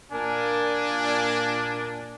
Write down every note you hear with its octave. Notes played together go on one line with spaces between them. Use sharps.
A#2 D4 A#4 G#5